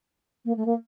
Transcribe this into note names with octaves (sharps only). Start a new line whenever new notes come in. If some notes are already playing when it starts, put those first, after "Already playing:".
A#3
A3
A#3